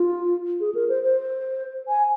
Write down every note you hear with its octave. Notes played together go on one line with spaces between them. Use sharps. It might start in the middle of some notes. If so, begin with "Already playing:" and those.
Already playing: F4
G#4
A#4
C5
C5
G#5